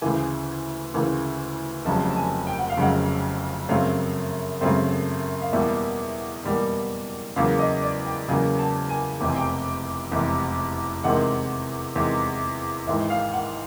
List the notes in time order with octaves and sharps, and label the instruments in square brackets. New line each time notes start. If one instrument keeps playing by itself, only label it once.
[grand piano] D2 C#3 E3 G#5
D2 C#3 E3
F1 F2 C#3 F#3 A5
A5
G#5
G5
F#5
F5
F1 F2 C#3 F#3 F#5
F#2 C#3 F#3 A3 C4 F5
F#2 C#3 F#3 A3 C4
F5
E2 B2 G3 A#3 E5
E2 B2 G3 A#3
E2 C#3 F#3 A#3 F5
D#5
D5
G5
E2 C#3 F#3 A#3 G#5
A5
G#5
F1 E2 C3 G5
G#5
G5
F1 E2 C3
E2 C3 D#3 G#3 F#5
E2 C3 D#3 G#3
G#1 G#2 E3 E5
F5
F#5